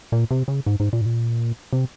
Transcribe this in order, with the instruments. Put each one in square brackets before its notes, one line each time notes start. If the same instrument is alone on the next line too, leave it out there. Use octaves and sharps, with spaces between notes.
[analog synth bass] A#2
C3
C#3
G#2
G#2
A#2
G#2
A#2
C3